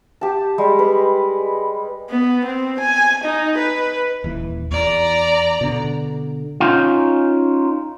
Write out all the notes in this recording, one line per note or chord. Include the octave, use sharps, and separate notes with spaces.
G4 A5
G3 G#3
B4
B3
C4
G#5
D#4
B4
D#1 E3
E2 D5 A#5
B2 D3
C#4 D#4 F4